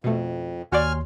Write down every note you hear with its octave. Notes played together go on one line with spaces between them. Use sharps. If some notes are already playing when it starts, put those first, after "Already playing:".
F2 B2 A3
D#2 F#4 C#5 D5 G#5 C6 F6